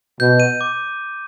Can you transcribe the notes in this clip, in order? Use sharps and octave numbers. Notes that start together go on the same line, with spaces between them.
B2 G6
D#7
D6